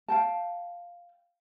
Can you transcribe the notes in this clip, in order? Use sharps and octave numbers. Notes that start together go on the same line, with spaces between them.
F5 G5 A5